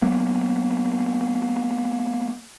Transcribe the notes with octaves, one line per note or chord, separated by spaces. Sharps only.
F#3 A#3 B3